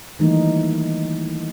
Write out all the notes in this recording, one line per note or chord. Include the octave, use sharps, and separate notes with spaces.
D#3 E3 G3 A3 A#3 D#4